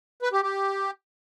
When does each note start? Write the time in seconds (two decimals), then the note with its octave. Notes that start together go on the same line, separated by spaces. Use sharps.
0.22 B4
0.32 G4
0.43 G4